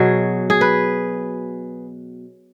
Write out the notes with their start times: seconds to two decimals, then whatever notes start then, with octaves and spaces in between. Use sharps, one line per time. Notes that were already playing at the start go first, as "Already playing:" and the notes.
Already playing: B2 F#3 G#4
0.50 G#4
0.61 B4